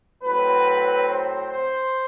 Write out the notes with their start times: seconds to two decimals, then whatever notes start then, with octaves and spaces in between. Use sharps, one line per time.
0.23 A2 F#3 C4 B4
1.07 C5
1.50 C5